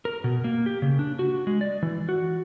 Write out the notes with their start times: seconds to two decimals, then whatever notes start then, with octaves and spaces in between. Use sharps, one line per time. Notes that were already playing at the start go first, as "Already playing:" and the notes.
0.05 A#4
0.24 B2
0.44 A#3
0.66 G4
0.82 C#3
0.99 D4
1.19 F#4
1.47 G#3
1.61 D5
1.83 E3
2.09 F#4